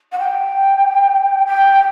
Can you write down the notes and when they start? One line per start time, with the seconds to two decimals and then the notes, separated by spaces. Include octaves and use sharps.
0.12 F#5
0.19 G5
1.46 G5